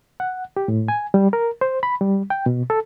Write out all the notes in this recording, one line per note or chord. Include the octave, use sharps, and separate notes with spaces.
F#5
G4
A2
G#5
G3
A#4
C5
B5
G3
G5
B2
A4